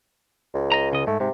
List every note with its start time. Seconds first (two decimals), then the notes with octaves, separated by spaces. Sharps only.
0.54 C#2
0.72 D#5 A#5
0.92 C#3 D#5
1.07 G#2 A3
1.20 G#2 C3